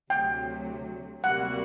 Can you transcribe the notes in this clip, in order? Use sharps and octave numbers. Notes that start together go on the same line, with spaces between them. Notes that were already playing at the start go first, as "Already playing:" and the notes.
D2 C3 F#3 G5
D2 C3 G3 A#3 F#4 F#5